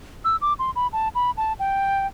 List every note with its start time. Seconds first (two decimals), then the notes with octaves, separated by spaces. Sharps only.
0.25 E6
0.41 D6
0.59 C6
0.76 B5
0.93 A5
1.15 B5
1.37 A5
1.59 G5